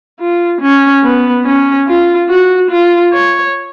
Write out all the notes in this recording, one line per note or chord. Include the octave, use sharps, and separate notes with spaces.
F4
C#4
B3
C#4
F4
F#4
F4
C#5